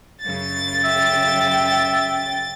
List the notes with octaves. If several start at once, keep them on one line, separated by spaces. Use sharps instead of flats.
F#2 C#3 A6
E5 G5